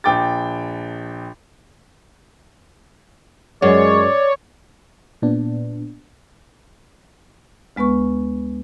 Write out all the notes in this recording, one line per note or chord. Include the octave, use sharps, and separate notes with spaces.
A#1 G5 D6 A6
F#2 G#3 C#5 D5
A#2 B3 D4
D2 G#3 B3 B4 C#6